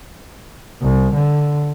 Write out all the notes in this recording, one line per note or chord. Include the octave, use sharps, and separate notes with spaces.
C2
D3